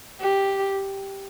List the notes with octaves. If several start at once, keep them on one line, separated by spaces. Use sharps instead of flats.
G4